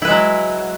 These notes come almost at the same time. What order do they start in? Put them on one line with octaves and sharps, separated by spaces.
E4 B4 G#3 F#3